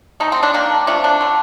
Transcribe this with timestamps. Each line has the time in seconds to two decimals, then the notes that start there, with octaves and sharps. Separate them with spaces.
0.20 D#3 A3 D#4
0.32 C4
0.43 D4
0.54 D#3 A#3 D4
0.87 C3 F3 A3 D4
1.04 D4
1.21 D3 A3